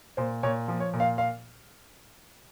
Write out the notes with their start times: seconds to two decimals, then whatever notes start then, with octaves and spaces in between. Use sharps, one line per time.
0.17 A#2 C5
0.43 A#2 C#5
0.68 F3
0.80 C#5
0.93 A#2
1.00 F5
1.18 F5